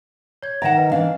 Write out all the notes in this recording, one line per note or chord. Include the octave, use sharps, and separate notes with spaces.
C#5 G#6
D#3 E5 F#5 G5 A#5 A#6 E7
B4 D#5
E3 C#4 D4 F5